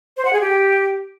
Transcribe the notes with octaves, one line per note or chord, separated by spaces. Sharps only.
C5
F#5
G#4
G4